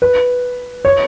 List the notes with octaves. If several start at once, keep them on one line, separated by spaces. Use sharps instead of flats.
B4
C#5